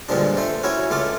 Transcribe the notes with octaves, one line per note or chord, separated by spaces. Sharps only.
G2 A#2 D3 F3 G#3 D4
A3 C5
C#4 E4 F#4 C#5
C#2 A3 F4 D6